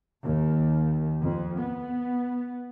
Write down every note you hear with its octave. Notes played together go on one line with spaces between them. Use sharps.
D#2
F2
B3